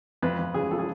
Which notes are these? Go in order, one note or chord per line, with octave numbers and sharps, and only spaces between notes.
F2 B4
F2
C#3 G#4
F3 A4
G#4